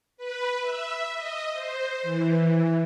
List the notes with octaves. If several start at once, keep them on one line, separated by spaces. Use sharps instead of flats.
B4
E5
D#5
C5
E3